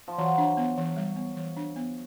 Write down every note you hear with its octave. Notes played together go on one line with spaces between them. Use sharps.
F3
E3 F#3
D4
B3
E3
G3
B3
E3
D4
B3